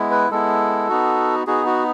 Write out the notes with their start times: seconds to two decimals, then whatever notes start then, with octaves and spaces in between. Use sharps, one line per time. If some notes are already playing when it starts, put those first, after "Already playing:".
Already playing: G#3 B3 E4
0.11 B4
0.30 G#3 B3 E4 A4
0.89 B3 D#4 F#4
1.47 B3 D#4 F#4 G#4
1.66 F#4